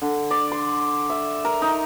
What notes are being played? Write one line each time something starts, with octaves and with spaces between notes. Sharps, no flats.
D3
D5
C6
E5
A#4
D#4